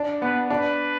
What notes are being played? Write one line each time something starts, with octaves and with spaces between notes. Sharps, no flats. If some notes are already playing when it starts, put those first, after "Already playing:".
Already playing: D4
B3 B4
D4 B4